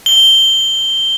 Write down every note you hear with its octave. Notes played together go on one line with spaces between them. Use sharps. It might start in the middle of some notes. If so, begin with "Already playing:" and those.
G7